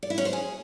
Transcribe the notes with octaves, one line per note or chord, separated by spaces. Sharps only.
D5
E4
C#4
C5
G#4